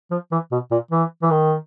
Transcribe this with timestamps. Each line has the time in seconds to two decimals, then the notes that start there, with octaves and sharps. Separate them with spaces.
0.11 F3
0.31 E3
0.51 B2
0.71 A#2
0.91 E3
1.22 E3
1.30 D#3